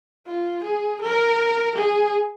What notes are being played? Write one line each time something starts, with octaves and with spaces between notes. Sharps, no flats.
F4
G#4
A#4
G#4